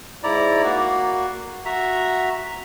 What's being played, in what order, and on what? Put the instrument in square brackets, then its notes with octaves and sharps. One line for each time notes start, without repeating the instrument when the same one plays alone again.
[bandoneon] G#2 E4 D5 A#5
A#3 F#4
F#4 E5 A#5